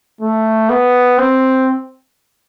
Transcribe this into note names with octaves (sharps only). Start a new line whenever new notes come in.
A3
B3
C4